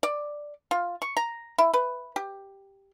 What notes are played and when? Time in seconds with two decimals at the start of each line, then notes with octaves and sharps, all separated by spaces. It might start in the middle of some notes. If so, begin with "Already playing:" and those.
0.03 D5
0.71 F4
1.02 C#6
1.17 A#5
1.58 E4
1.74 B4
2.16 G4